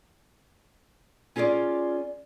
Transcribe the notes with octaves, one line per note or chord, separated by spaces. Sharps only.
C#4 F4 G#4 C#5 D5